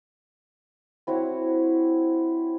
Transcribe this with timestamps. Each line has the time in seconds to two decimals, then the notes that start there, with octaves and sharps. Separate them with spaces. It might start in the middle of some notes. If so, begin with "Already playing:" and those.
1.07 C4 E4 F#4 C#5